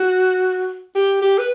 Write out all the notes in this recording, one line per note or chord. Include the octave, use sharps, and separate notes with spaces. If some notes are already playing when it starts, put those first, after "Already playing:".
Already playing: F#4
G4
G4
B4